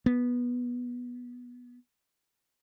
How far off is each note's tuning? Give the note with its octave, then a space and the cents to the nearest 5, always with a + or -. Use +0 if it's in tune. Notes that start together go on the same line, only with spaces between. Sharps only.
B3 -10